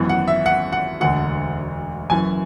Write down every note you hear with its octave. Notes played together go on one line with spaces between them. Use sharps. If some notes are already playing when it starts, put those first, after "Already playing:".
Already playing: G#1 F#2 E3 B3
F#5
E5
F#5
F#5
E1 D2 D3 F#5
F#1 F#2 E3 G#5